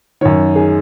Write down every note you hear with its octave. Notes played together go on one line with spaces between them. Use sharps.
F#2 D#3 C#5
D#3 G#4